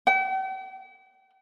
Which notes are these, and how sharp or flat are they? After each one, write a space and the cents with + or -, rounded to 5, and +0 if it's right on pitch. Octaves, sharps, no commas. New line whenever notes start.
G5 -45